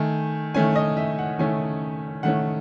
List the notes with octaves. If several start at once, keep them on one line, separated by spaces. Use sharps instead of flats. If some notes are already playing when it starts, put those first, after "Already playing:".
Already playing: D#3 A3 G#5
D#3 A3 C#4 G#5
D#5
E5
F#5
D#3 A3 C#4 G#5
D#3 A3 C#4 F#5